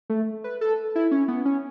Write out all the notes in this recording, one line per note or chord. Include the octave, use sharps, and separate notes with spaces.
A3
B4
A4
E4
C#4
B3
C#4